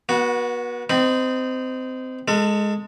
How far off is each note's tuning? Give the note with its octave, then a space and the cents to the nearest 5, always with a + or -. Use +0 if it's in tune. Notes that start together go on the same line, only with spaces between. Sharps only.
B3 -35 F#4 +0
C4 -25 D#4 +0 B5 +0
G#3 +0 A4 +30